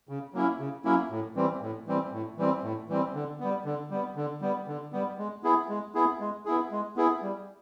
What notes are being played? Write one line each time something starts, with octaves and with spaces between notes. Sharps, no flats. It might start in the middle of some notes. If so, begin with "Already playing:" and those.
C#3
F#3 A#3 C#4 E4
C#3
F#3 A#3 C#4 E4
A2
E3 G3 C4
A2
E3 G3 C4
A2
E3 G3 C4
A2
E3 G3 C4
D3
G3 B3
D3
G3 B3
D3
G3 B3
D3
G3 B3
G#3
B3 E4 G#4
G#3
B3 E4 G#4
G#3
B3 E4 G#4
G#3
B3 E4 G#4
G3